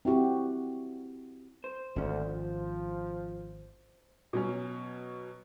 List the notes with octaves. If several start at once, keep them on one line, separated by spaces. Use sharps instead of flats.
C4 E4 F#4 G4
C5
G#1 D2 C#4
F3
B2 F#3 C#4